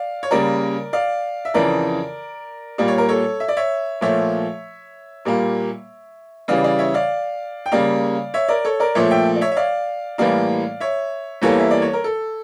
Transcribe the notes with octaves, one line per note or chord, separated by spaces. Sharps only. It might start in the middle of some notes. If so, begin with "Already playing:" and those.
Already playing: D5 F5
C#5
C#3 G3 A#3 A#4 D5
D5 F5
E5
F2 C#3 E3 A#4 D5
A#2 G3 A#3 D5
C#5
A#4
A4 C#5
E5
D5
C#5 E5
A#2 F3 A3 C#5 E5
A#2 G3 A#3
C#3 E3 G3 D5 F5
D5 F5
C#5 E5
D5 F5
G5
C#3 G3 A#3 D5 F5
C#5 E5
A#4 D5
A4 C#5
A#4 D5
A#2 F3 A3 C#5 E5
E5 G5
D5
C#5 E5
E5
D5 F5
A2 E3 G3 A#3 D5 F5
C#5 E5
E2 E3 G3 A#3 A4 C#5
E5
D5
C#5
A#4
A4